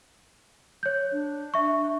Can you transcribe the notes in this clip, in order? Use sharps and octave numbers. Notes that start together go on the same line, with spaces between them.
C#5 G6
D4
E5 C#6